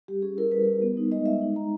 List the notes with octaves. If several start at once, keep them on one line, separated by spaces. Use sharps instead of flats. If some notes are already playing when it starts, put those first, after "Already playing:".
G3 G4
C#4 G#4
E4 A#4
G3 B4
G3
B3
D#4
G#3 D#5
G#3 E5
D#4
G#3 A#5